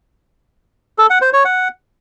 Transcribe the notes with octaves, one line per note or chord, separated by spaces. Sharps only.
A4
F#5
C5
C#5
F#5